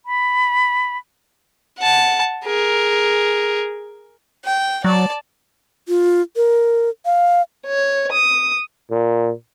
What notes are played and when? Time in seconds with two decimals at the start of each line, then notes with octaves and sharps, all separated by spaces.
0.06 B5
1.79 F#5 A5
2.45 G#4 A#4
4.44 G5
4.84 F#3 D5 A5
5.88 F4
6.36 A#4
7.06 F5
7.66 C#5
8.12 D#6
8.91 A#2